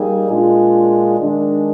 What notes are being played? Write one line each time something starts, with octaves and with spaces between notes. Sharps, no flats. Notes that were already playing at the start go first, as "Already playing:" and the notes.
Already playing: G3 A#3 D#4 G#4
A#2 G#3 D4 F4 G#4
D#3 G#3 D4